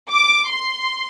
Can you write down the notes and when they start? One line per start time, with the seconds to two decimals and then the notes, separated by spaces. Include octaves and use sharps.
0.11 D6
0.50 C6